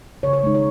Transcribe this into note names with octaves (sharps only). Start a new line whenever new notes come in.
C#3 C#5
C#5
G#3 D#4
C#5